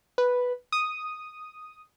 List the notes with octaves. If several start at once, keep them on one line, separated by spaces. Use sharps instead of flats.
B4
D#6